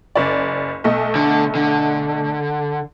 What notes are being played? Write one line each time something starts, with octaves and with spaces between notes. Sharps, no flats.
F#1 D5
B1 A3 D#5
D3
D3